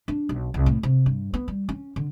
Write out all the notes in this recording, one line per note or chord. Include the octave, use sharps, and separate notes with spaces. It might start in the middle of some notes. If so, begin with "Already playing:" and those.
D4
B1
C2
A2
C3
G2
B3
G3
C#4
D3